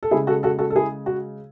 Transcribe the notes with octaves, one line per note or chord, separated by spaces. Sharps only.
A4
C#3 G#3 E4 G#4
F#4 A4
F#4 A4
F#4 A4
A4
E4 G#4
F#4